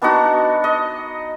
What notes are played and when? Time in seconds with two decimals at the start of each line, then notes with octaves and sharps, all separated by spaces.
0.02 B3 D4 D#4 F#4
0.64 D#5